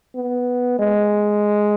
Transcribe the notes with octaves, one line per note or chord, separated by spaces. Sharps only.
B3
G#3